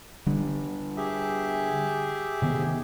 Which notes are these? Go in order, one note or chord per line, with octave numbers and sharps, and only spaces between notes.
D3 G3 D4
G4 G#4 E5
C3 D#3 B3